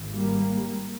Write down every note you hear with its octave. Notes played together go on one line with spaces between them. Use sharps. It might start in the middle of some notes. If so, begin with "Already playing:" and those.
Already playing: G#1 G#2
G3 A#3